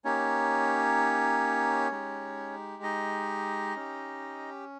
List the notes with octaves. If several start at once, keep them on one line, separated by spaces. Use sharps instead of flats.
A#3 C#4 D#4 G4 C#5
G#3 D#4 G4
D#4 D#5
C#4 G4